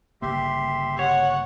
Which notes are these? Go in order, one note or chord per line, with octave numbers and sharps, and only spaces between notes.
G1 C#3 A#3 G4 E5 C6
C#5 F#5